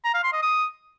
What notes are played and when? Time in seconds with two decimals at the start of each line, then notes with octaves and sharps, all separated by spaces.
0.04 A#5
0.14 F5
0.23 C6
0.33 D#5
0.42 D#6